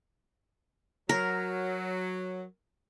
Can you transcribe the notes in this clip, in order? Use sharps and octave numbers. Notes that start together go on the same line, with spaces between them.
F#3 A#4